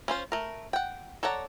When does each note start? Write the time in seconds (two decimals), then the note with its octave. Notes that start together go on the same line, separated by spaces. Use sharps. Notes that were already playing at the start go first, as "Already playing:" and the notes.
0.08 C#4 F4 C5
0.32 A3 A#4
0.73 F#5 G5
1.23 A4 C#5 D5 F#5 A#5